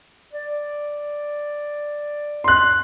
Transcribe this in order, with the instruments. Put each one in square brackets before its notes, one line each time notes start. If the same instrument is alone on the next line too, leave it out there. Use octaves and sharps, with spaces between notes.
[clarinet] D5
[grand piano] C6 F#6